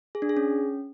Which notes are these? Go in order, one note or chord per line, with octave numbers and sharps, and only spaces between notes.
G#4
D4
G#4
C#4